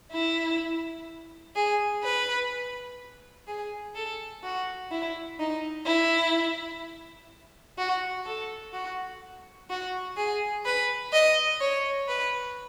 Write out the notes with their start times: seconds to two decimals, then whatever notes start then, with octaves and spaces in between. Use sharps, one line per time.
0.12 E4
1.56 G#4
2.04 B4
3.47 G#4
3.95 A4
4.43 F#4
4.91 E4
5.39 D#4
5.86 E4
7.78 F#4
8.26 A4
8.73 F#4
9.70 F#4
10.17 G#4
10.66 B4
11.13 D#5
11.61 C#5
12.08 B4